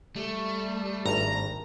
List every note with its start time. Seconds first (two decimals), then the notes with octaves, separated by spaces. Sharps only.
0.16 G3 A3
1.06 G#1 G2 A#5